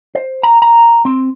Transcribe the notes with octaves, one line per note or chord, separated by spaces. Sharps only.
C5
A#5
A#5
C4